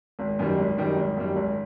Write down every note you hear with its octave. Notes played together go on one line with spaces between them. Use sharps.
G#1
F#2 D#3 G3
G#1
F#2 D#3 G3
G#1
F#2 D#3 G3
G#1